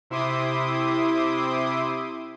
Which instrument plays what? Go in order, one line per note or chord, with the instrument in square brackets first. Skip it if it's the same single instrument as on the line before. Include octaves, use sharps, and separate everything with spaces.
[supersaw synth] C3 E4 E5 C6 D6 D#6